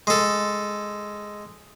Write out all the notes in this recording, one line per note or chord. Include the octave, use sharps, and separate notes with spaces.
G#3 A4